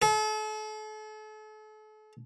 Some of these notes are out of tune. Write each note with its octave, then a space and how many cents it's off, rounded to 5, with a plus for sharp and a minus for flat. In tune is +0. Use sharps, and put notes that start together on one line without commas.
A4 -40